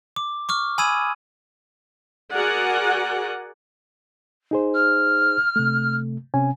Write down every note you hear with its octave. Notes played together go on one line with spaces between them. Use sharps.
D6
C#6 D6 F6
G#5 B5 D#6 E6 G#6 D#7
F#4 G#4 A#4 D5 F#5 G#5
D#4 G#4 C5
F6
C3 A3
C3 C#4 G#5